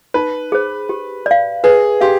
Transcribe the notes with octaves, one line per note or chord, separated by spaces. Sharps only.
D#4 B4
G#4 C5
G4
D5 F5
G#4 B4
G4 F5 C6